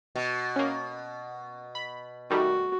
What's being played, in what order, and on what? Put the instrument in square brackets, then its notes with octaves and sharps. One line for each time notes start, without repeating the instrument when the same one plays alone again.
[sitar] B2
[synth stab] A#3 C#4
B5
[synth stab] D#3 G3 A3 [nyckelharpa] F#4